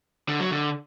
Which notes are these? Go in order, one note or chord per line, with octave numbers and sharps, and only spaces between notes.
D3
F#3
D3